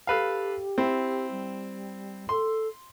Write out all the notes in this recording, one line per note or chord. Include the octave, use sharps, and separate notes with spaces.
G4 A4 B4 F5
C4 E4
G3
A4 C6